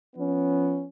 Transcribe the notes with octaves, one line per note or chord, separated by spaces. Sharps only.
F3 B3 C#4